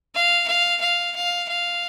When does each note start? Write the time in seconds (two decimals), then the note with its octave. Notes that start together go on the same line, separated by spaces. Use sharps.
0.15 F5
0.48 F5
0.81 F5
1.16 F5
1.48 F5